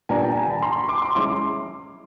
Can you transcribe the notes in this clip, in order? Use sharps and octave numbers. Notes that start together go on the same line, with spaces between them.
A#2 G3 B3 D4 G#5 A#5
G5 A5
G#5 A#5
A5 B5
A#5 C6
B5 C#6
C6 D6
C6 D6
G#3 C#4 E4 C6 D6